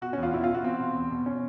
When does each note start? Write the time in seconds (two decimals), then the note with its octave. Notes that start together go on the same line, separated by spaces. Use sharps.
0.01 B2 F#4
0.13 C#4
0.17 E2
0.23 F4
0.34 B2 E4
0.44 F4
0.49 B2
0.54 F#4
0.64 B2 C4
0.80 B2
0.95 E2
1.11 B2
1.26 B2 C#4